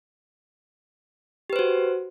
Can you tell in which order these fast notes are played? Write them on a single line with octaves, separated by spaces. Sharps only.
G4 B4 C5 F#4